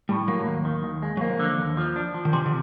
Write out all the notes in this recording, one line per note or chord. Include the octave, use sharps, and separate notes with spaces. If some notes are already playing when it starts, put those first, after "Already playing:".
A2 G3
F#3 A#3
D#2
D#3
D#2
G#3
F#3
F3 A#3
D3
D#2
F3
D4
F3
D#3
C3 E3
D3